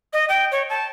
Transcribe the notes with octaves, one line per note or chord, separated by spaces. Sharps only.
D#5
G5
C#5
A5